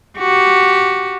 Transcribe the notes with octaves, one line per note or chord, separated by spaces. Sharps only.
F#4 G4